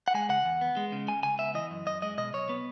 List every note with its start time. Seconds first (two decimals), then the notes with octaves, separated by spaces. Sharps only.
0.08 F#5
0.14 G#3 G#5
0.29 C#3 F#5
0.45 E2
0.61 B3
0.77 G#3
0.92 C#3
1.08 C#2 G#5
1.23 C#2 G#5
1.39 B3 E5
1.54 E3 D#5
1.71 F#2
1.87 F#2 D#5
2.02 G#3 D#5
2.18 B2 D#5
2.33 B1 C#5
2.49 B3